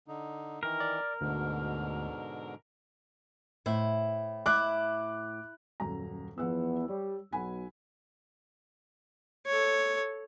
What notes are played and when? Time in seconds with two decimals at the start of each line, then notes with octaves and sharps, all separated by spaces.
0.08 D3 D#4
0.63 D#3 E3 A#4
0.80 D5
1.21 D2 G#2 B2 D3
3.66 A2 E4 C5
4.46 E4 D6 F#6
5.80 D#1 F#2 A#5
6.38 E2 F3 B3 F#5 E6
6.88 G3 C#5
7.32 B1 F#5 G#5 B5
9.46 A4 C#5